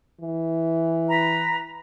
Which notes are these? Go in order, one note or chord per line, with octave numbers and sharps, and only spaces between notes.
E3
B4 A#5 B5